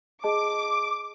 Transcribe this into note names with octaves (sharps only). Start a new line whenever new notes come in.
G#4 D#5 A5 D6